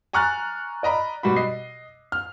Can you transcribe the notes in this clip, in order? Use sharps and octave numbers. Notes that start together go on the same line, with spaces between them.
G#5 A#5 C#6 F6 F#6 A6
D5 D#5 A#5 B5
B2 G3 F#4 B5
D#5 C7
F6